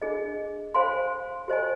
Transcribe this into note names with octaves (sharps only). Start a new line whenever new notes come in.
D4 G#4 D#5
C5 F5 G#5 C6
G4 C5 D#5 G#5